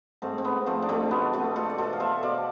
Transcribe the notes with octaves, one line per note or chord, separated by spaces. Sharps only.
G#2 A3 C4
C4
G#2 B3
F3 A3 C4
D4
B2 A3 C4
B2 B3
B2 A3 C4
B2 F4 A4
D5
B2 A4 C5
F5
B2 C5 E5
B2 D5 F5